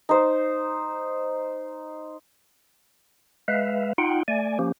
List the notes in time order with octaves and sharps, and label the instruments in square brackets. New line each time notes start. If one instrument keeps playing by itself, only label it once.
[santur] D#4 C5
[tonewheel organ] G#3 B4 E5 F5
D#4 F4 F#5 G5
A3 D5 G#5
F3 A#3 C#4 G4